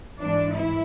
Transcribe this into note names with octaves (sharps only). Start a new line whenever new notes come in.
G#2 E3 D4
E4